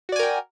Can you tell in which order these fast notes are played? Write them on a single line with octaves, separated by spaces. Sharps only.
F#4 D5 G#5 A#4 G5